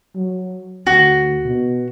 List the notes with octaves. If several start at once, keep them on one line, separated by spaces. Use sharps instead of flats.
F#3
D2 F#4
B2